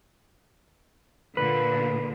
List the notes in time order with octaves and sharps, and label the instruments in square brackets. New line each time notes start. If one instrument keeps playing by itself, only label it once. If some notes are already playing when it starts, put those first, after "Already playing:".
[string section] A#2 D3 [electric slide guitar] B4